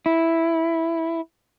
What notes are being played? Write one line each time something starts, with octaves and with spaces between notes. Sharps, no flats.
E4